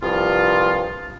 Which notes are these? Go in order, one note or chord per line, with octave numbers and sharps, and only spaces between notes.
C2 G2 F3 F4